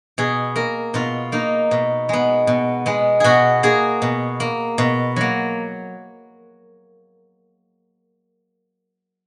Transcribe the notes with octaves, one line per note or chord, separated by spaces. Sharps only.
B2 G#4
A#3 A#4
B2 F4
A#3 D#4
B2
G#3 B3
B2
G#3 B3
B2 F#4 G#4
A#3 G#4
B2
A#3
B2
F#3 A#3